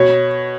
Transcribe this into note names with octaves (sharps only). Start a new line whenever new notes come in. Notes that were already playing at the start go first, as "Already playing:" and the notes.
Already playing: B2 C#5